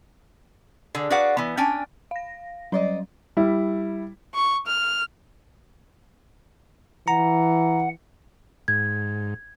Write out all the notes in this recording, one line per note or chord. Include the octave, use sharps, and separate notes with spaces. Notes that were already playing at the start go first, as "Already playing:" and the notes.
D3 G#4
F#4 G#4 B4 D5 F5 F#5
E3 B3
C#4 D4 G5 G#5
F5 A#6
F#3 G3 C#4 C5 D5 D#5
G3 E4
C#6
F6
E3 F#5 A#5
G#2 G#6